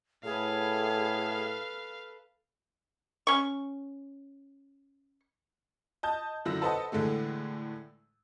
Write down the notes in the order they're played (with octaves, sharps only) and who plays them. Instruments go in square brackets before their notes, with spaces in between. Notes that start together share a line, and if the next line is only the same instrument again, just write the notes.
[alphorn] A2 [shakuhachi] G#4 [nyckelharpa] A4 B4 [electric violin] F5
[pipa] C#4 C#6
[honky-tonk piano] D#5 A5 G6
F#2 D3 E4 E6 A#6
A4 B4 C5 D#5 F#5 A5
A2 D3 E3 G#3 A3